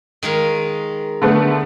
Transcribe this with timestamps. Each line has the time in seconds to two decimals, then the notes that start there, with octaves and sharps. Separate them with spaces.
0.23 D#3 G#3 F5
1.22 D3 A3 B3